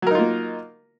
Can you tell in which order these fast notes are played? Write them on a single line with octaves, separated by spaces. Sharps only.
F#3 A#4 D#4 F4 A#3